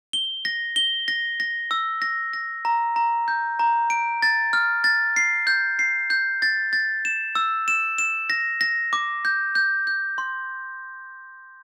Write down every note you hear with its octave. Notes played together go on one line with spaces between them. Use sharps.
G7
A#6
G7
A#6
A#6
E6
A#6
A#6
A#5
A#5
G6
A#5
D7
A6
F6
A6
C7
G6
C7
G6
A6
A6
E7
E6
E7
E7
A#6
A#6
D6
G6
G6
G6
C6